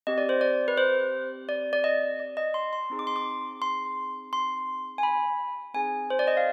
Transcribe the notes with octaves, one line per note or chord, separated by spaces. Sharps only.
C4 G4 D#5
D5
C5
D5
B4
C5
D5
D5
D#5
D5
D#5
C6
C6
C4 D#4 G#4
D6
C6
D6
C6
C6
G#5
B5
C4 D#4 G#4 G#5
C5
D5
D#5
F5